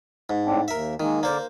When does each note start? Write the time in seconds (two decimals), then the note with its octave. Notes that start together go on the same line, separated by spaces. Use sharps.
0.30 G#2
0.45 A2 C4 D4
0.68 D#2 A#4 E5
1.00 D#3 G#3 A#3
1.23 D3 A#3 A#4 C5 D5